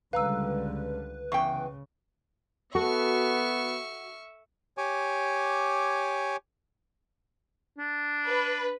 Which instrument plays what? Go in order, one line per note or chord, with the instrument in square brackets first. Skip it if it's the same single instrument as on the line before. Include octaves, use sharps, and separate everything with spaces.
[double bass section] C#2 D3 G3 [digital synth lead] B4 [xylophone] F5 A#5 E6
[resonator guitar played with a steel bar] E2 G5 [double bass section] C#3 [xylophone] C#6
[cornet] B3 [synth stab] F#4 [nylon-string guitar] A4 [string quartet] E5 C#6 F6
[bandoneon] G4 C#5 G#5 D6
[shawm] D4
[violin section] B4